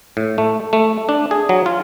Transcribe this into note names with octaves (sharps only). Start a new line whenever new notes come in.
A2
A3
A3
D4
G#4
F#3
F4